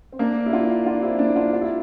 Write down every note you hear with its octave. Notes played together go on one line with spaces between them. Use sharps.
C4
A#3 D4
E4
D4 F4
D4 F4
C4 E4
A#3 D4
D4 F4
F4
E4